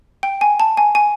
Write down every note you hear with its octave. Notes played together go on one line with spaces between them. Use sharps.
G5
G#5
A5
G#5
G#5